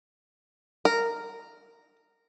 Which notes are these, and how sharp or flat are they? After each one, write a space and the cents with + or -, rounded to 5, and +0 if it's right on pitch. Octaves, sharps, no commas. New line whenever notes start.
A#4 -10